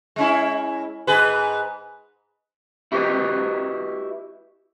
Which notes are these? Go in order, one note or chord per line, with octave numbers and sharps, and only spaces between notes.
G#3 C#4 E4
G#2 G#4 B4
E4 F#4 G4 A#4 B4 D#5